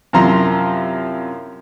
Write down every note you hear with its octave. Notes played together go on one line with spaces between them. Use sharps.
F#2 C3 F3 E4 A#5 C6